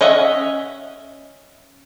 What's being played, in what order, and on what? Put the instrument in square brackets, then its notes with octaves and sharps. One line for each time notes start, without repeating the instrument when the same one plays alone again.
[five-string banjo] C#4 D#5 E5 F#5